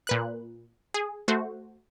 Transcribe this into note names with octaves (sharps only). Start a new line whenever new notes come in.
A#2 B4 F#6
G#4
A3 F#4 C5